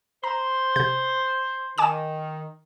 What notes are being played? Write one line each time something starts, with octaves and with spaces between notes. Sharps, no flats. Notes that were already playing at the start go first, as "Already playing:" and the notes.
C5 A#5
C3 G6
D#3 G#5 D6 E7